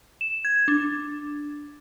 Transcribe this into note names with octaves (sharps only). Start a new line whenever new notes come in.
E7
G#6
D4